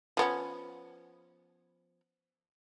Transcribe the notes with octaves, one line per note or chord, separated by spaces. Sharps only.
F3 B3 C#4